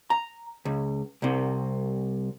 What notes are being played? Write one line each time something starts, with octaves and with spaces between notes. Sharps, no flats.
A#5
C#2
C2 C3